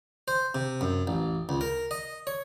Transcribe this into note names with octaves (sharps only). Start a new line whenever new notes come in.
C5
C3
F#2
A1
C#2
A#4
D#5
C#5